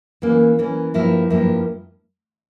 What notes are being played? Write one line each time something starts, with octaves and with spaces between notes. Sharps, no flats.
E3 A#3 C#4
E3 A#3 C#4
G2 F3 A#3 E4
G2 F3 A#3 E4